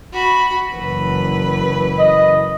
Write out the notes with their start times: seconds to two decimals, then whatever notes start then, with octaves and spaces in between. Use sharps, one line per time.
0.13 F#4 B5
0.72 F#1 E3 B4
1.99 D#5